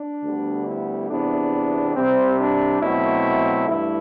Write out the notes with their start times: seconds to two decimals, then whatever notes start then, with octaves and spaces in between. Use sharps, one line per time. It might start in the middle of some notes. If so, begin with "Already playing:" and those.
Already playing: D4
0.24 D2 D3 G3 B3
0.67 E4
1.10 E2 C3 E3 B3 D4
1.95 C2 C3 G3 C4
2.39 D4
2.81 B2 F#3 A3 C4 E4
3.67 G2 E3 A3 E4